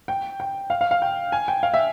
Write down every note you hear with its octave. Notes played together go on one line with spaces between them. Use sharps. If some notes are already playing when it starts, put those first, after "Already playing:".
G5
G5
F5
F5
F5
G5
G#5
G5
F5
E5